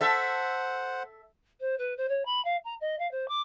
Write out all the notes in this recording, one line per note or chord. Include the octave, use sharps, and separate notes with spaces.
A4 C5 E5 F#5
C5
B4
C5
C#5
B5
F5
A#5
D#5
F5
C5
D6